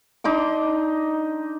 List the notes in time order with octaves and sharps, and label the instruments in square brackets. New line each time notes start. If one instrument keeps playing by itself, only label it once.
[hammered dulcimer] D4 D#4 C6 D6